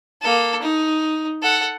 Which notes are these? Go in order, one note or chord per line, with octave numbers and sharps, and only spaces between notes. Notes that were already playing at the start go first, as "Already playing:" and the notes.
A#3 A4
D#4
A4 F#5